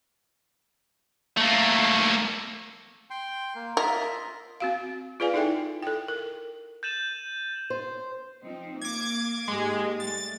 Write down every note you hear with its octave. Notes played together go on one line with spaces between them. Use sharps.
A3 A#3
G5 C6
A#3
F4 A#4 D#5 E5
C4 F#4 F5
F4 G#4 B4 D5 F5 G#5
D#4 E4 A4 E5 G5
A4 G5
A#4
G6 A6 D#7 E7 F#7
C5
F3 C4 D#4
A#3 D6 G#6
G#2 G#3 A#3 G4
G3 A3 A6